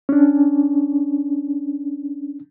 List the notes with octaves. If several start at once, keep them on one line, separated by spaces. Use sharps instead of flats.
C#4 D4